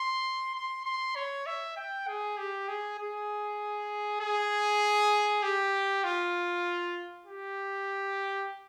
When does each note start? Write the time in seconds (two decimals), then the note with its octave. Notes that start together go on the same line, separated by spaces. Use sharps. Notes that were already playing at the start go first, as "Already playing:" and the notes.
Already playing: C6
0.55 C6
0.85 C6
1.15 C#5
1.46 E5
1.77 G5
2.07 G#4
2.38 G4
2.68 G#4
2.99 G#4
4.21 G#4
5.43 G4
6.04 F4
7.26 G4